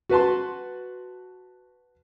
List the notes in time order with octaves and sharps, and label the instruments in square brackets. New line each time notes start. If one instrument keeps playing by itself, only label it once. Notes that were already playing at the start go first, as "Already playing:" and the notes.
[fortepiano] F#4 B4 A5 C6